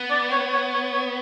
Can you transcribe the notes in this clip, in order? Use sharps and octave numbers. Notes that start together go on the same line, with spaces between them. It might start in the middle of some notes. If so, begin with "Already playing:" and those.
Already playing: B3
D5
C#5
C#5
C#5
C#5